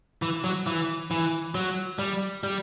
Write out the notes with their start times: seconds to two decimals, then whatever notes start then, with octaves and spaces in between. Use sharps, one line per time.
0.22 E3
0.44 F#3
0.67 E3
1.11 E3
1.55 F#3
1.99 G3
2.44 G3